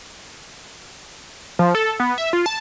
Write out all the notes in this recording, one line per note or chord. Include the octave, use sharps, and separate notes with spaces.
F3
A4
B3
E5
F4
A5